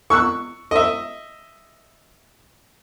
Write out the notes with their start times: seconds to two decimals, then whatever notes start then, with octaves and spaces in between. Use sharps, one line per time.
0.10 C#6 E6 F#6
0.71 D#5 E5